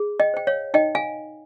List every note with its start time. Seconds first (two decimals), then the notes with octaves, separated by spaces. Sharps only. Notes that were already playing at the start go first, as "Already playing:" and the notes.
Already playing: G#4
0.20 D#5 G5
0.34 C5 G5
0.47 C#5 F5
0.74 D#4 D#5 G5
0.95 F5 G#5